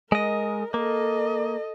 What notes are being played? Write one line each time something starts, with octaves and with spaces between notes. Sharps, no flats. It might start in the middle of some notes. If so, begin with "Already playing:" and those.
G#3 A#4 D#5
A#3 A4 D#5